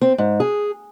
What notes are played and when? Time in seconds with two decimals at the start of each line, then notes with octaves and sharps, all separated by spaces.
0.01 C4
0.18 G#2
0.40 G#4